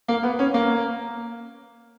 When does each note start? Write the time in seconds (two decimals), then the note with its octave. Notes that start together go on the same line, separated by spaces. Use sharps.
0.08 A#3
0.23 B3
0.39 C#4
0.54 A#3